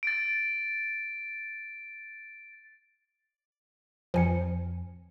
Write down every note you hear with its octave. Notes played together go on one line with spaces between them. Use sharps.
A6 D7
F2 F3 G#5 C#7